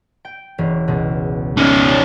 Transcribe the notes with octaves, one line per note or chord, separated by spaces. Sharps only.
G5
E1 E3 C#4
C#2 B2
C#4 D#4